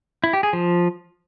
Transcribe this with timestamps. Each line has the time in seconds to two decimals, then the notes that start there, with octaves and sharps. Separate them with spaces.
0.24 E4
0.33 G4
0.43 G#4
0.53 F3